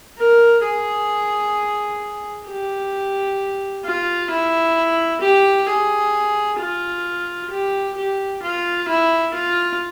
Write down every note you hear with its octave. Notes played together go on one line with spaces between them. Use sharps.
A#4
G#4
G4
F4
E4
G4
G#4
F4
G4
G4
F4
E4
F4